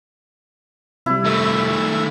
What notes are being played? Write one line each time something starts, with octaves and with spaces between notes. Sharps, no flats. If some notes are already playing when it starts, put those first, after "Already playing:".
C3 G3 E4
D#3 A3 E5